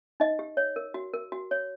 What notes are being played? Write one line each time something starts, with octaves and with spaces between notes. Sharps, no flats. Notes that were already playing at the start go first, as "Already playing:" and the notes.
D#4 D#5
G4
C#5
A#4
F#4
A#4
F#4
C#5